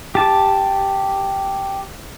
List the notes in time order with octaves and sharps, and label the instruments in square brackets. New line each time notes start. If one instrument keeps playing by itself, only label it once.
[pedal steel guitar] G4 A5